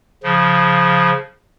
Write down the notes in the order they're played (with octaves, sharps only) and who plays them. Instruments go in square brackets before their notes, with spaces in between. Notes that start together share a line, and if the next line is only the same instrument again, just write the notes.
[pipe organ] C#3 F3